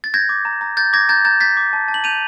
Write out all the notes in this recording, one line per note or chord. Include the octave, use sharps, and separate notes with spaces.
A6
G6 G#6 A#6
D6
A#5
A#5
G6 A6
D6 G#6 A#6
A#5 G6 A6
A#5 G6 A6
G6 A6 B6
D6
A5
A5
F#7
G6 D#7 F7